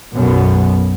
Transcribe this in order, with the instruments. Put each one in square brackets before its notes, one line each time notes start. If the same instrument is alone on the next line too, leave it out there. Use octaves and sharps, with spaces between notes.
[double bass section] B1 F#2 B2 B3